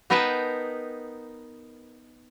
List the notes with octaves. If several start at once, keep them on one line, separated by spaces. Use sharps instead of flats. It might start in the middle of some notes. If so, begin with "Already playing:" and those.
B3 D#4 A#4 B4 G5 A5